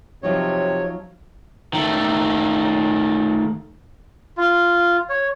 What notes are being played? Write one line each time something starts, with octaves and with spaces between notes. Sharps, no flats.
C3 F3 F#3 D#4 C#5
D#3 A3
F4
C#5